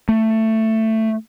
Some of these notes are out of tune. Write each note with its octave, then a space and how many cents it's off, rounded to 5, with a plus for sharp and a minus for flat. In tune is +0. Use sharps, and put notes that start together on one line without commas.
A3 +10